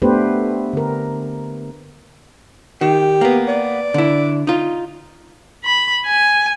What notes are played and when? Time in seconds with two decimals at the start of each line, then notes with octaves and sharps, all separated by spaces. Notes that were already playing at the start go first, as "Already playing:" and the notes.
0.02 A3 B3 D4 G4 B4 C5
0.73 D3 A#4
2.81 D#3 G4
3.21 A#3 B3
3.48 D5
3.94 D3 E4
4.47 D#4 F4
5.65 B5
6.07 G#5